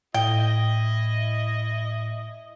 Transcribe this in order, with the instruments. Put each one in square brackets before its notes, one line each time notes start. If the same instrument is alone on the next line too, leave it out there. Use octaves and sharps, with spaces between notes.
[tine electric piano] A2 [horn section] E4 D#5 [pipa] G5